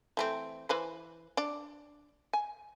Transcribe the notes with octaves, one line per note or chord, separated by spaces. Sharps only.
E3 A3 C4
E3 B4 C5
D4 D5
G#5